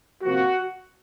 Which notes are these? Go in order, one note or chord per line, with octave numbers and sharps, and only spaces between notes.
C3 F3 A#3 F#4